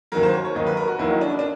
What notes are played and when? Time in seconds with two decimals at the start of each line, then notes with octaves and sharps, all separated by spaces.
0.12 D#2 D#3 F#3 A#4
0.23 C5
0.33 C#5
0.45 C#5
0.55 D#2 D#3 F#3 D#5
0.67 B4
0.77 A#4
0.87 F#4
0.98 D#2 D#3 F#3 E4
1.10 D#4
1.21 D4
1.39 D4